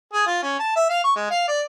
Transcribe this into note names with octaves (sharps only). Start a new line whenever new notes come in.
G#4
F4
C#4
A5
E5
F5
C#6
G#3
F5
D5